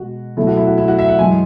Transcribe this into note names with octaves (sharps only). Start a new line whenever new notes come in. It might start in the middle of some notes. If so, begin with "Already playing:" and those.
Already playing: B2 G#3 F#4
B2 F#3 A3 E4
F#4
E4
F#4
E4
F#4
E5
F#5
F#2 E3 G#3 G#5